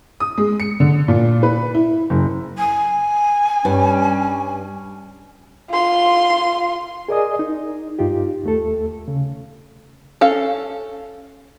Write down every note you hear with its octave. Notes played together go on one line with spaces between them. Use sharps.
D#6
G#3
C#7
D3
A#2
B4
E4
F#1
G#5
G2 G3 C#4
F4 C6
G#4 A#4 D5 D#5 G#5 D#6
D#4
G2 D#4 F4 G4
D#2 A3 A4
C#3
C#4 A4 F5